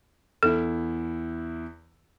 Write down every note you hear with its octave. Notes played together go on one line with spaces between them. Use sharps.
E2 E4 A4